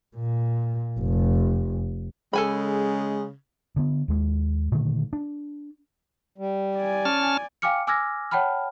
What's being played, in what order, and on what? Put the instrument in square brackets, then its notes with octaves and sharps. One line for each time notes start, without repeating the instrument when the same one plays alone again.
[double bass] A#2
F1
[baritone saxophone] C#3 [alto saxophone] G#3 [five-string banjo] A4 G#5 B5
[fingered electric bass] D3 B3
D#2 G#3
A#2 D3 D#3 A3
D4
[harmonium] G3
[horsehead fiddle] D5 G#5
[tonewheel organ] C#4 A5 F6
[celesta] F5 G5 G#5 D6 F6 C#7
G#5 D6 E6 F6 G#6 A#6
C#5 F#5 G5 A5 B5 F6